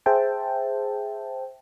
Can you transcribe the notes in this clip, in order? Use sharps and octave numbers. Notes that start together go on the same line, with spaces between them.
G#4 C5 E5 G5 A5